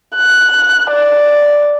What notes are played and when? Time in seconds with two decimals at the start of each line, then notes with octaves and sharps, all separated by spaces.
0.16 F#6
0.90 D5